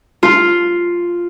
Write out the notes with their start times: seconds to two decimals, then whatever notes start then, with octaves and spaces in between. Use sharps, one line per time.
0.23 F4